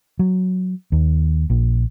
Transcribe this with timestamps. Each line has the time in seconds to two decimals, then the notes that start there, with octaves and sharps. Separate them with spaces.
0.19 F#3
0.92 D#2
1.50 A#1